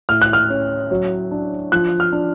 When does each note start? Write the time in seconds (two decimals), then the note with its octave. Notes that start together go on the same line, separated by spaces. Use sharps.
0.09 A2 F6
0.22 F#6
0.33 F6
0.50 C#4
0.91 F#3
1.32 D4
1.72 F3 F#6
2.00 F6
2.13 D4